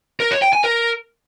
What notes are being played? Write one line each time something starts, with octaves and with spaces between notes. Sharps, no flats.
A#4
C#5
G5
G#5
A#4